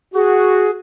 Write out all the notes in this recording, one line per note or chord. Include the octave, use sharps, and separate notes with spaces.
F#4 G#4